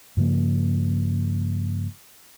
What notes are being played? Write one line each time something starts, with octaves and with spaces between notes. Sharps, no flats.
G2 C#3 F3 A#3